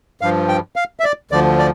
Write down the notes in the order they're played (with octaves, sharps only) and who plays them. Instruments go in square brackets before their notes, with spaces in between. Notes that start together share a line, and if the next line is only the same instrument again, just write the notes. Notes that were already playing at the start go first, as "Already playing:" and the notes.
[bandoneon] G2 F3 F5
G5
F5
E5
D5
D2 D3 F3 D5
D5